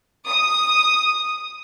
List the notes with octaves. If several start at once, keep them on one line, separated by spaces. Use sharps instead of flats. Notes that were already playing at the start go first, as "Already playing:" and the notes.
D#6